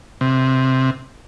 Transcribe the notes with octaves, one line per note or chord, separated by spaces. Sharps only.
C3